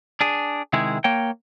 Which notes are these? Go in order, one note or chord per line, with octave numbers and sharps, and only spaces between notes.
D4 G#4
C3 D#3 G#3 E4 G#4
A#3 C#5 G5